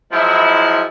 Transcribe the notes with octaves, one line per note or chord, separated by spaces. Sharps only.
F3 F#3 G#3 E4